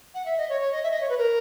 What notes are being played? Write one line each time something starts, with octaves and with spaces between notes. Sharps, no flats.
F#5
E5
D#5
C#5
C#5
D#5
E5
D#5
C#5
B4
A#4